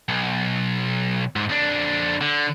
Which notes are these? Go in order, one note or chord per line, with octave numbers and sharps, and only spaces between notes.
B1
G#2
F2 D4
D3